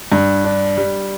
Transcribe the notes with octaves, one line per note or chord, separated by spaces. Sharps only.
G2
D4
G3